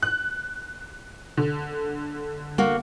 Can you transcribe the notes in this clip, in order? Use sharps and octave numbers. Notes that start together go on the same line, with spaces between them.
F#6
D3
A#3 F#4